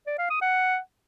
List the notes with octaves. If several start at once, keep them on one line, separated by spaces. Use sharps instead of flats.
D5
F5
D#6
F#5